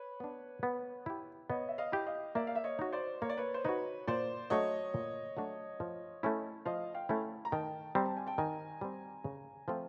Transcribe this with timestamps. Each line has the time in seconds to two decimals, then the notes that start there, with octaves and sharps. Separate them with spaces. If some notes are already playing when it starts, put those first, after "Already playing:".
Already playing: B4 C#5
0.20 B3 D4
0.63 B3
1.06 E4 G4
1.49 B3 C#5 D#5
1.69 E5
1.78 D#5 F5
1.92 E4 G4
2.07 D#5 F5
2.35 A#3 D5 E5
2.47 F5
2.55 E5
2.64 C#5 D#5
2.79 D#4 F#4
2.93 C5 D5
3.22 A#3 C#5
3.30 D5
3.37 B4 C#5
3.54 C5
3.64 D#4 F#4 B4 C#5
4.07 A#2 C5 D5
4.50 F#3 A3 D4 F#4 C#5 D#5
4.94 A#2
5.37 F#3 A3 D4 F#4
5.80 F3
6.23 A3 C#4 E4
6.65 F3 D#5 F5
6.94 F5 G5
7.09 A3 C#4 E4
7.45 A#5
7.52 D#3 G5 A5
7.95 G3 C4 A#5
8.06 A5
8.17 G#5
8.27 G5 A5
8.38 D#3 G#5 A#5
8.81 G3 C4
9.24 C#3
9.68 F3 A3 C4 F4